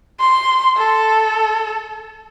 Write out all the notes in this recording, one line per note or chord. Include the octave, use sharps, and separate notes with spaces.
C6
A4